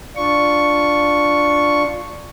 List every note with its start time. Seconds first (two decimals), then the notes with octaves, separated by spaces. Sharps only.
0.16 D4 F4 C#6